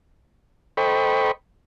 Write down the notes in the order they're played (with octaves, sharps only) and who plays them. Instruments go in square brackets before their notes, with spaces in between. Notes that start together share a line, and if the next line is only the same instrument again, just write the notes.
[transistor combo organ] A4 C5 D#5 G5 B5 C#6